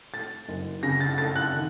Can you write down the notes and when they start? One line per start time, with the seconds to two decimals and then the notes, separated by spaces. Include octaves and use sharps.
0.13 A3 A6
0.49 F#1
0.83 C#3 A#6
1.00 A6
1.18 A3 A6
1.36 F#6
1.54 D#3